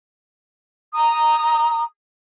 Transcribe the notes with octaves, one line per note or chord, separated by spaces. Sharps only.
A#5 D#6